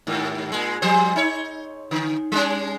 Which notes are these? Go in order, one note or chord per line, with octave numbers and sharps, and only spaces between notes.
D#2 G#2
A#2 G#3
F3 G3 C5
D#4 C#5
D3
G3 G#3 C#4